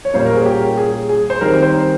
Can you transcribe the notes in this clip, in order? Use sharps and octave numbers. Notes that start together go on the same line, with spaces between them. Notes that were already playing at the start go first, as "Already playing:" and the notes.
C#5
A#2 G3 A#3 C#4 C5
A#4
G#4
G4
G#4
G#4
C5
D#3 G3 C4 A#4
C5